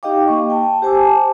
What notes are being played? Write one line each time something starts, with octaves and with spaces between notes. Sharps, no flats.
D#4 G4 D#5 F5 G5 D6
A#3 C#6
G5 A5
G4 C5 G#5 A5 D6 E6